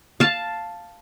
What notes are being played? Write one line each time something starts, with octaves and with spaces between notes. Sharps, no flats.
F5 A5